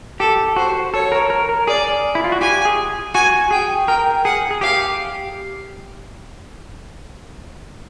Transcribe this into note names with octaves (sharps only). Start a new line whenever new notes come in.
G4 A4
F#4 C5
A4 C#5
A#4
A#4
A#4
G#4 D5
E4
F4
F#4
G4 G#5
G#4
F#4 G#5
G#4 G5
A#4 G5
G#4 F#5
G#4
G4 F5